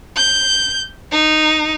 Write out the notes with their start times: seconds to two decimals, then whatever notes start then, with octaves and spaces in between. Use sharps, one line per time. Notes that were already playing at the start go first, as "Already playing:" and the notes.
0.16 G6
1.12 D#4